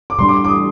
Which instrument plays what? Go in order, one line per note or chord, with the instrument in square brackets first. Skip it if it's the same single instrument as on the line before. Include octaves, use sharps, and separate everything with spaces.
[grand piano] D6
[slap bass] A2 G3 D4 [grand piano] C6
[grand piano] D6
D6
D#6